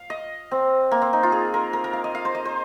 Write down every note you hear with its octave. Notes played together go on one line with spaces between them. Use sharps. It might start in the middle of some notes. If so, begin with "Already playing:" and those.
Already playing: F5
D#5
C4
A#3
C4
D#4
F4
G#4
A#4
A#4
A#4
F5
D#5
F5
C5
D#5
C5